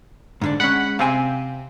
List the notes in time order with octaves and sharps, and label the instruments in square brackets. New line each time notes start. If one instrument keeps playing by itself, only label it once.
[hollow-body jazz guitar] G#2 D3 D4
[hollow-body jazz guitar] G#3 C#4 [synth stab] F#5 B5
[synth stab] C3 C4 [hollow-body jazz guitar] F5 G#5